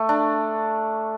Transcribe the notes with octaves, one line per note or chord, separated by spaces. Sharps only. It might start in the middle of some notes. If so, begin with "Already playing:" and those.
Already playing: A3
D4